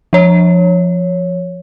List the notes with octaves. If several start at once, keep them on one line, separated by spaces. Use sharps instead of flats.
F3 C#5